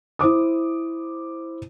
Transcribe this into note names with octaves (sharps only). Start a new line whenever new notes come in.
E4 C5 D6 D#6